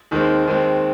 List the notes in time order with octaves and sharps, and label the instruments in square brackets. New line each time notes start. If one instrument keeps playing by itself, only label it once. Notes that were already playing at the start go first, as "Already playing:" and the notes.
[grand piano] D#2 D#3 G#3 C4
D#2 D#3 G#3 C4